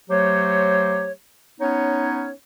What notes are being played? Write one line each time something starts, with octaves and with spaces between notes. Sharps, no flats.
F#3 A3 G4 C5 C#5
B3 C#4 D#4 C#5